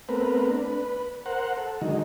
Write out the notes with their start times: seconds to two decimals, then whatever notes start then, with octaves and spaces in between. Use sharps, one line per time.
0.09 A3 B3 C4 A#4 B4
0.49 D4
0.65 B4
1.26 A#4 C5 F#5
1.57 A4
1.81 D3 D#3 F#3 G#3 D#4